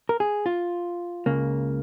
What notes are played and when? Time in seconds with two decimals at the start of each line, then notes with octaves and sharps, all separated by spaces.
0.09 A#4
0.20 G#4
0.46 F4
1.26 C#2 C#3 A#3